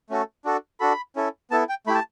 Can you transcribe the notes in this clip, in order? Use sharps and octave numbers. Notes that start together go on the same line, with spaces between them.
A3 C#4 F#4 A4
D4 F#4 A4
D4 F#4 A4 B5
C#4 E4 A4
B3 E4 A4 A5
G5
A3 E4 G4 B5
A5